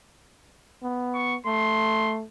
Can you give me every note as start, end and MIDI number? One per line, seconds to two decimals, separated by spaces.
0.83 1.36 59
1.14 1.36 85
1.46 2.24 57
1.46 2.15 84